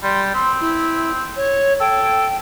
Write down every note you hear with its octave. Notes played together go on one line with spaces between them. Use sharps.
G3 C6
C4 C6
E4
C#5
A4 G5